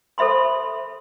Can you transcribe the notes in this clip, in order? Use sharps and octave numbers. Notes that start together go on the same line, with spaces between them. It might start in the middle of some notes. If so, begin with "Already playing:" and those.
A4 C5 E5 B5 C6